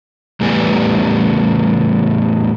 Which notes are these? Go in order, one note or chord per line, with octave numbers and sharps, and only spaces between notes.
E2 A2 G3 B3 G#5